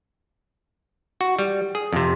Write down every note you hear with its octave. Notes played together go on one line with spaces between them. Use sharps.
F#4
G3
G#4
F2 C3